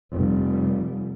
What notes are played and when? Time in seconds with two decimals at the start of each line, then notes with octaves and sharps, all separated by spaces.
0.13 F1 G3